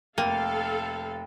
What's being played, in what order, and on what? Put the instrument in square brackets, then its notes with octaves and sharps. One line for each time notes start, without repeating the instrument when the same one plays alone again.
[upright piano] F1 D#7 [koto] A#3 [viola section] A4 F5 [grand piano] G5